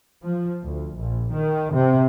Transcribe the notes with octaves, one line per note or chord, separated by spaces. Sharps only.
F3
D2
A#1
D#3
C3